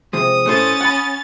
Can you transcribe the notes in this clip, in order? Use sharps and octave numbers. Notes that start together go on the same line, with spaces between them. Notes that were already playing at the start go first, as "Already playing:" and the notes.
C3 F3 G#3 D#6
A2 A3 C#4 C5 A6
F#5 B5